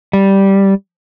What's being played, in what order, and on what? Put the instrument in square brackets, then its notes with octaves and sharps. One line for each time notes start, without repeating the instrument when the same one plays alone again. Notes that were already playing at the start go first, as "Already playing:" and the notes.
[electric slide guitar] G3